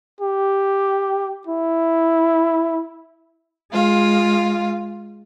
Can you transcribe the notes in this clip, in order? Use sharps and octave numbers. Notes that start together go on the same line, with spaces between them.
G4
E4
G#3 F4 F5